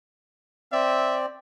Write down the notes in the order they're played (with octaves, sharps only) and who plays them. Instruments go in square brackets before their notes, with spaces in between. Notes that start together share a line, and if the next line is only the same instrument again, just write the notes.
[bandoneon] C4 D5 [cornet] E5